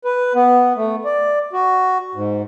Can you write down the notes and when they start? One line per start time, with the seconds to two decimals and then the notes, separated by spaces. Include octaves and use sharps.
0.05 B4
0.35 B3
0.76 A3
1.05 D5
1.53 F#4
2.15 G#2